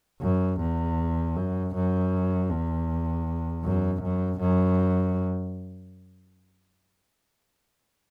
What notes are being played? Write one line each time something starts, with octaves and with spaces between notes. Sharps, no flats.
F#2
E2
F#2
F#2
E2
F#2
F#2
F#2